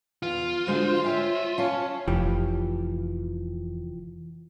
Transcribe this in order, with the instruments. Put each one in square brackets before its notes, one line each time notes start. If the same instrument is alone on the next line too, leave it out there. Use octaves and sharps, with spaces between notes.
[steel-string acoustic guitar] E2 [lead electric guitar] F4
[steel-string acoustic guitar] D3 G#3 F#4 [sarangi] C5
[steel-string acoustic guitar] C#5 G5 G#5 [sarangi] E5
[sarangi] C#4 [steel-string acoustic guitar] F5 A5
[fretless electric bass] F1 [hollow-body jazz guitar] E3 F3 G4